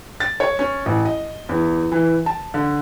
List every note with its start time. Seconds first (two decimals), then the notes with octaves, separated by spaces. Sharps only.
0.20 A6
0.40 C#5
0.59 C#4
0.86 A1
1.05 D#5
1.49 E2
1.92 E3
2.26 A5
2.54 D3